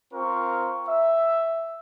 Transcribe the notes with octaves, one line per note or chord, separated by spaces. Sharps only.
C4 F4 A#4 C#6
E5